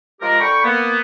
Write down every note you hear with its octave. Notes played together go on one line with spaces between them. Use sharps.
F3 G#3 G4 A#4
D3 G5 B5 C#6
A#3 B3